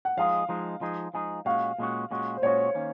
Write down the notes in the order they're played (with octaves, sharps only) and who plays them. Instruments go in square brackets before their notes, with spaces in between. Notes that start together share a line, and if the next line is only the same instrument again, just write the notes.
[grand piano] F#5
[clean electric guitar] F3 G#3 D#4 G#4 [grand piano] F5
[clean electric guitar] F3 G#3 D#4 G#4
F3 G#3 D#4 G#4
F3 G#3 D#4 G#4
[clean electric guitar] A#2 G#3 C#4 F#4 [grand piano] F5
[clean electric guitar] A#2 G#3 C#4 F#4
A#2 G#3 C#4 F#4
[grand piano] C5
[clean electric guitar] A#2 G#3 C#4 F#4 [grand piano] C#5
[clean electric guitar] D#3 A#3 C#4